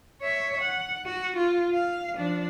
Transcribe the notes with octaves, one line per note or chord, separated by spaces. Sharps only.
C#5 E5
F#5
F#4
F4
F5
F3 D4